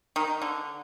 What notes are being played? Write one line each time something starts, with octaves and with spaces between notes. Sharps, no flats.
D#3
D3